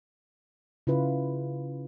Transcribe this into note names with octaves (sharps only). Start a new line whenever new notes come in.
C#3 E4 F4 B4